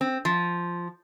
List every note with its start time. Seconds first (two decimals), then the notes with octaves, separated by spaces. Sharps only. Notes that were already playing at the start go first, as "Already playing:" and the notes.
0.01 C4
0.25 F3